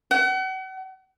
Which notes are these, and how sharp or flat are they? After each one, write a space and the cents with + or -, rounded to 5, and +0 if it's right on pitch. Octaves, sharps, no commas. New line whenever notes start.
F#5 +40